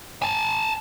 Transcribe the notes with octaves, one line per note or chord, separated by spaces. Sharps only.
G#5 A5